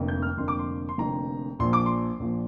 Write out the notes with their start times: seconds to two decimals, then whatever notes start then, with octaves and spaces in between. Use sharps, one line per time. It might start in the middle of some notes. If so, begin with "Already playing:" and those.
Already playing: F1 F2 D3 A#3
0.08 G6
0.22 F6
0.38 F1 F2 D3 A#3 C6
0.48 D6
0.59 C6
0.89 C6
0.98 F1 F2 D3 A#3 A#5
1.59 A#1 A#2 F3 C6
1.73 D6
1.86 C6
2.19 A#1 A#2 F3